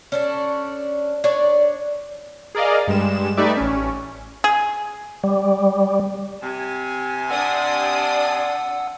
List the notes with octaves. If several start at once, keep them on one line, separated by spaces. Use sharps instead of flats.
C#4 D4 A4
D4 C#5 D5
G#4 A#4 D5 D#5 F5
G2 G3 G#3 E7
A3 D#4 G4 B4 D5 E5
A1 C#4
G#4
G3
C3 G#5
D4 D5 F#5 C6 D#6 E6